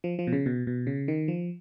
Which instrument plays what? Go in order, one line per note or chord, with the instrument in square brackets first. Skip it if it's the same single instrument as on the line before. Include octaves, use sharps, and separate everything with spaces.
[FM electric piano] F3
F3
B2
C#3
B2
B2
C#3
D#3
F3